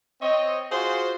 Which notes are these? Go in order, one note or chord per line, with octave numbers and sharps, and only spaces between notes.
C4 C#5 D#5
F4 F#4 G#4 C5